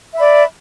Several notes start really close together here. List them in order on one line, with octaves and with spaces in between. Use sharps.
E5 B5 D5